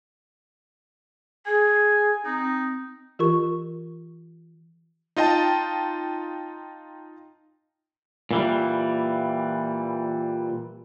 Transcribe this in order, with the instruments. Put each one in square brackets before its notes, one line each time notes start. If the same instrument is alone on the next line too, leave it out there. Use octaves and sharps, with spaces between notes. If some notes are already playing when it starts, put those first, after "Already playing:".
[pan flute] G#4 [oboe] G#5
[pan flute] C4 [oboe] D#4
[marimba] E3 F4 G4 A#4 C#6
[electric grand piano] D#4 F4 D#5 G5 A5
[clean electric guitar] A#2 E3 G3